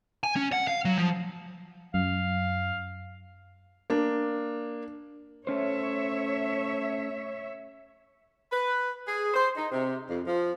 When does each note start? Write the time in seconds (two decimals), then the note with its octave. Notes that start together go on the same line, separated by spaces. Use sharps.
0.23 G#5
0.36 C#4
0.52 F#5
0.67 F5
0.85 F#3
0.98 F3
1.94 F#2 F5
3.90 A#3 D4
5.47 A3 C#4 C5 C#5 E5
8.52 B4
9.07 G#4
9.34 C5
9.57 D#4
9.72 C3
10.10 F2
10.27 F3